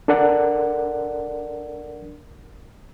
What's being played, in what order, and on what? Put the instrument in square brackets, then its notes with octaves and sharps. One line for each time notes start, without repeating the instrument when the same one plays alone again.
[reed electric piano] D4 A4 A#4 D5 F#5